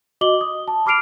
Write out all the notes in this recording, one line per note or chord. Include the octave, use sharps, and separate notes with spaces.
F#4 D#5 D6 F#7 G7
D#6
A5
B5 D6 F6 C7 D7 F7